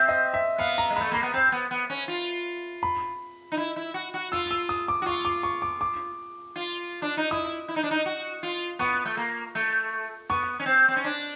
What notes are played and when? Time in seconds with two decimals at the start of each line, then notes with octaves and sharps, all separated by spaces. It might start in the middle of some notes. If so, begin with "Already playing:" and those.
Already playing: C4 E5
0.09 D#5
0.34 E5
0.58 B3 F5
0.78 A#5
0.90 G#3
0.96 A3 B5
1.11 A#3 B5
1.23 B3
1.34 C4
1.52 B3
1.71 B3
1.90 C#4
2.08 F4
2.83 B5
3.52 D#4
3.57 E4
3.76 E4
3.94 F#4
4.14 F#4
4.32 F4 E6
4.51 E6
4.69 D#6
4.88 D6
5.02 F#4
5.06 F4 C#6
5.25 D6
5.43 C#6
5.62 D6
5.81 D6
6.56 F4
7.02 D4
7.17 D#4
7.31 E4 D#6
7.68 E4
7.76 D#4
7.83 D4
7.91 D#4
8.06 F#4
8.43 F4
8.79 B3 C#6
9.05 A3
9.17 A#3
9.55 A3
10.29 B3 C#6
10.60 C#4
10.66 C4
10.88 C4
10.96 C#4
11.04 D4